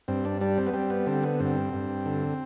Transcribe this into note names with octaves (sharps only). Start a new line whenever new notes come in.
G2 C4
D4
G3 D4
C4
B3
G3 C4
B3
D3 C4
B3
G2 C4
G2
D3